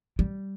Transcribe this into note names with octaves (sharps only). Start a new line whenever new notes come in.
G3